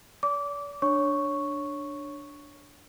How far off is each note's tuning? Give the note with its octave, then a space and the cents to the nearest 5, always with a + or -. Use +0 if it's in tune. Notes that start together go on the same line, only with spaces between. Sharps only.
D5 -45 D6 -20
D4 +0 C#5 +0 C#6 +0